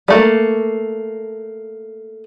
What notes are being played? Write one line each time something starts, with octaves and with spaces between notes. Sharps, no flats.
G3 A3 A#3